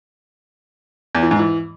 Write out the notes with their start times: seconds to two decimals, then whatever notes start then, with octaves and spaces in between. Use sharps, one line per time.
1.15 E2
1.23 E3
1.31 G#2
1.39 E3